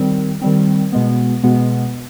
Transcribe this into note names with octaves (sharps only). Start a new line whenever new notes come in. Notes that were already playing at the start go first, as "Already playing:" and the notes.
Already playing: D#3 G3 C4
D#3 G3 C4
B2 G#3 B3
B2 G#3 B3